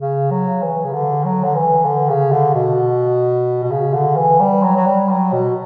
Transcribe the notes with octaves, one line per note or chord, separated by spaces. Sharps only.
C#3
F#3
E3
C#3
D3
F#3
D3
E3
D3
C#3
D3
B2
B2
C#3
D3
E3
G3
F#3
F#3
G3
F#3
B2